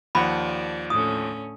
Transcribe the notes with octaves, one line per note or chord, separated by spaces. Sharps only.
D#2 F3 D5 F#5 B5
A2 D3 C#4 D#6